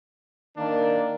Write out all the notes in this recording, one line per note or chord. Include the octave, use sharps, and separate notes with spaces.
D#3 A#3 D4